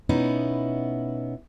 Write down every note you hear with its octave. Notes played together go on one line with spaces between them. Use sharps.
B2 B3 C#4 D#4 E4